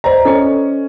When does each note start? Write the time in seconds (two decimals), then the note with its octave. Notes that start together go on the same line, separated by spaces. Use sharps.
0.04 C5 D5 D#5 A#5
0.25 C#4 A4 D#5 G5